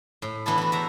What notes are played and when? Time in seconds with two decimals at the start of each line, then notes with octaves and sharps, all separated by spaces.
0.22 A2
0.46 E3 B3 D4 E4 A4
0.58 E4 F#4
0.72 E2 E5 A#5